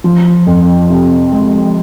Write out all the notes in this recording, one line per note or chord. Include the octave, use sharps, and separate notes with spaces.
F3
F2
C3
G#3